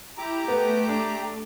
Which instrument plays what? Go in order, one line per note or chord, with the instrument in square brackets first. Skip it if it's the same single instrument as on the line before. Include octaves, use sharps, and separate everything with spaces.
[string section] E4 [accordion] G4 A#5 D6
[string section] A3 [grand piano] B3
[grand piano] D4